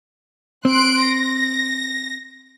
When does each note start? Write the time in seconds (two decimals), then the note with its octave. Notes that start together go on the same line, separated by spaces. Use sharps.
0.65 C4 C6 F#6 D7
1.05 A#6